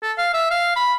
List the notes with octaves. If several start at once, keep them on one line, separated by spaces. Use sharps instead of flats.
A4
F5
E5
F5
B5